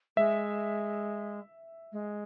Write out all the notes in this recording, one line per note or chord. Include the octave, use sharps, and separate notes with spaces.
G#3 E5
G#3